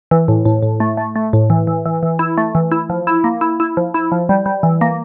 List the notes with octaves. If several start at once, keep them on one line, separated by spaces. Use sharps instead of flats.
E3
A2
A2
A2
A3
A3
A3
A2
E3
E3
E3
E3
E4
A3
E3
E4
F3
E4
A#3
E4
E4
F3
E4
F3
G3
G3
E3
A#3